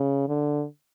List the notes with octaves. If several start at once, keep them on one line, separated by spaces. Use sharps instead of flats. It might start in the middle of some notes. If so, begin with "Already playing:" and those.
Already playing: C#3
D3